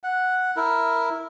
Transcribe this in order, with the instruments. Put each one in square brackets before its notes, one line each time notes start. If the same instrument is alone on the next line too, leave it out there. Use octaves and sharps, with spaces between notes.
[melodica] F#5
E4 A#4